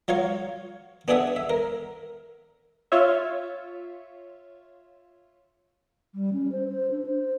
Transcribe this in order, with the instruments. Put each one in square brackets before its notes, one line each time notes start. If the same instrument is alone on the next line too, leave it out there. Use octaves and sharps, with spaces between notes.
[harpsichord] F#3 F4 C#5 F5 C#6
B3 D4 G4 G#4 E5 F#5
E5
A#4
[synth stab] F4 C#5 E5
[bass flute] G3
C#4
C5
C5
D4
C5